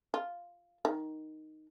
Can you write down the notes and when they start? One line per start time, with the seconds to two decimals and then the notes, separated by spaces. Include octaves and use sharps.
0.14 F4
0.85 D#3